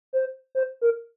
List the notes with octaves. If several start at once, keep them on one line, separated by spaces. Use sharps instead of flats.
C5
C5
A#4